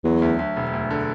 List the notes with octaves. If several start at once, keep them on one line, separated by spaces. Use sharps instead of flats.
E2 F#3
D2
D2
E1
D2
D3